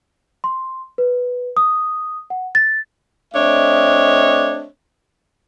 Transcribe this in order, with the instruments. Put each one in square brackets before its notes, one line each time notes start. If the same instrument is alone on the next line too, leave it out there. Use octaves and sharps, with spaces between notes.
[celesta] C6
B4
D#6
F#5
A6
[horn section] A3 C4 D4 C#5 D#5 E5